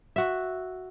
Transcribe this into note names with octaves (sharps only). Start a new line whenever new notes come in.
F#4 E5